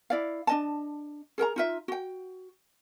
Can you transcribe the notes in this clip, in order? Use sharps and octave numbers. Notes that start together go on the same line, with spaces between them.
E4 D5 F5
D4 D#5 A5
G#4 A#4 G5 A#5
D#4 F4 E5
F#4 G5